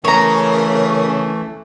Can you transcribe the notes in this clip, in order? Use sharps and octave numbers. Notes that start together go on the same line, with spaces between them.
C#3 E3 A3 A#4 C#5 A#5